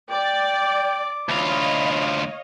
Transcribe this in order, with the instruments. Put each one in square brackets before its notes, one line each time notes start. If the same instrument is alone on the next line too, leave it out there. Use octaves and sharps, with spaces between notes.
[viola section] D5 [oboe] G5 [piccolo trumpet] D6
[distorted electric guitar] D2 F4 [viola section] C#5 D#5 F5 [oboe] B5